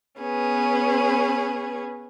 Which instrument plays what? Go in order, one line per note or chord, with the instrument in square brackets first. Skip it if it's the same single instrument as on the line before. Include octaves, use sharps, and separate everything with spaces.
[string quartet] B3 C#4 G#4 B4